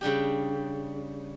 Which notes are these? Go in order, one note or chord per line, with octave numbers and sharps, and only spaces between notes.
C#3 G3 D4 G4